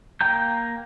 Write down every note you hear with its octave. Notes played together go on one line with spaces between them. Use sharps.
A#3 G5 A#5 G6